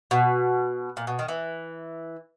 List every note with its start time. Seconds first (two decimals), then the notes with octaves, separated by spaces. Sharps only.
0.11 B2
0.97 A#2
1.07 B2
1.19 D#3
1.28 E3